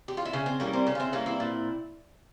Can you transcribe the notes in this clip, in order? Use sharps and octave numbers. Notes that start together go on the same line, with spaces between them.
G4
F4
E4
C#3 C#4
C4
E3 G3 A#3 C#4
C4
C#3 C#4
F4
C4 E4
E3 G3 A#3 C#4
C4 E4
A#2